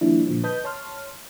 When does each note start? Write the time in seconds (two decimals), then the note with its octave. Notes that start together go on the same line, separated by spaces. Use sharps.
0.01 D#3 F3 G3 A#3 D4 E4
0.27 A#2 D3 F3
0.44 B4 D#5 A5 B5 D#6 G6
0.64 C#5 A5 C6 F6